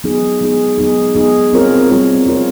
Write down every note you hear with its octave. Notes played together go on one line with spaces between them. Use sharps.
F#3 B3 D#4 G#4
F#3 B3 D#4 G#4
F#3 B3 D#4 G#4
F#3 B3 D#4 G#4
G3 C4 F4 A#4 C#5
G3 C4 F4 A#4 C#5
G3 C4 F4 A#4 C#5